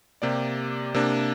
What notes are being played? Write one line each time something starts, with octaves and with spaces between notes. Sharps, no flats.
C3 A#3 G4 D5
C3 A#3 D4